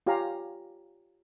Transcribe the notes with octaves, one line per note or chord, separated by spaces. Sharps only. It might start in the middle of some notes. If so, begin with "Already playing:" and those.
F4 G4 C#5 F5 G#5 A#5